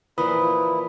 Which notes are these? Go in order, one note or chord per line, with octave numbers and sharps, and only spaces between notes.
A#2 E3 F3 E4 B4 F5 B5 D#6